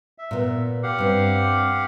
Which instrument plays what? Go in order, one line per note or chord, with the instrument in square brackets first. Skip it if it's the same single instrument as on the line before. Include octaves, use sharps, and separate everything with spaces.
[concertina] E5
[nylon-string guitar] A#2 B3
[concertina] G4 F5 F#5
[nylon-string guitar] G2 C4